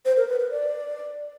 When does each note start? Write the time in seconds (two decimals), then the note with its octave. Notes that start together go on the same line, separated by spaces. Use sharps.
0.05 C5
0.17 A#4
0.28 B4
0.40 B4
0.51 D5